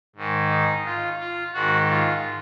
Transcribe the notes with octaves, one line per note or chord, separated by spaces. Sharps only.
G#2 D#3 G#3
D#4
F4
F4
G#2 D#3 G#3 F#4
F4